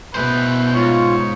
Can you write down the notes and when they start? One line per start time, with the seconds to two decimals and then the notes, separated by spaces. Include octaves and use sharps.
0.15 B2 E4 B4 C5
0.75 G#2 F4 C#5